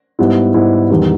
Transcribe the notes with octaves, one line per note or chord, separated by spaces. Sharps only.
G#2 G3 B3 E4
G#2 G3 B3 E4
E1 E2 D#3 G3